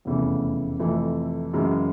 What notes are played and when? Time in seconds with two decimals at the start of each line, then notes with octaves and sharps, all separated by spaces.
0.05 F1 E2 C#3 E3 A3
0.79 F2 C3 E3 A3
1.54 F#2 C#3 E3 G#3